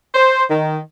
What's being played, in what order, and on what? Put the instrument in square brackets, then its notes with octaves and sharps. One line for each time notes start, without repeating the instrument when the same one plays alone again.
[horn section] C5
D#3